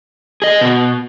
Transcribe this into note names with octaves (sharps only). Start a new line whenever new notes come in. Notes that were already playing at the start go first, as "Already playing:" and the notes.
G#4 D#5
B2